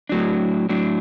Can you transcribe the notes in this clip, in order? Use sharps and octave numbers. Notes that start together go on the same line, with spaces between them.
A2 F#3 D4
A2 F#3 D4